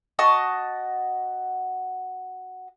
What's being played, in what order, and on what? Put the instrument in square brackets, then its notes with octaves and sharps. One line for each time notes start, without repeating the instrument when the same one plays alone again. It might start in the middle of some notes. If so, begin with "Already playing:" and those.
[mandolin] F#4 D#5 A5 C#6